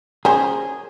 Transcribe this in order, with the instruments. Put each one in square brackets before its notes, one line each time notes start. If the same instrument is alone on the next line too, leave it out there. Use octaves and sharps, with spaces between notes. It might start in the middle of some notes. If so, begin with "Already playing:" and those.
[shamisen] C#4 A#4 C5 [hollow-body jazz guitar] G#4